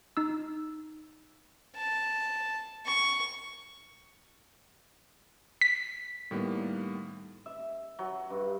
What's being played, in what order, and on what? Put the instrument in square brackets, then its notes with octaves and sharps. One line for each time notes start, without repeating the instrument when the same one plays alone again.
[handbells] D#4 E6
[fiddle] A5
C#6
[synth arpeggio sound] B6
[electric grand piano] A2 D#3 G3 A#3 B3
[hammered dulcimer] E5
F#3
G2